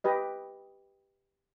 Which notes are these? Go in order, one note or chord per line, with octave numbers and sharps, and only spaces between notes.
G4 B4 D#5